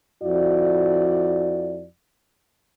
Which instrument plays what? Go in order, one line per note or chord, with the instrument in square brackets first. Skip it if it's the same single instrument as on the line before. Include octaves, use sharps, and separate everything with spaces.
[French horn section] F2 E4 F#4 D5